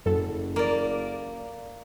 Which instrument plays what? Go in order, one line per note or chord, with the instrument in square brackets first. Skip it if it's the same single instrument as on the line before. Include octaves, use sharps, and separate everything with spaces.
[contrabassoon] F#1 [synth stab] F#2 A4
[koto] A#3 D5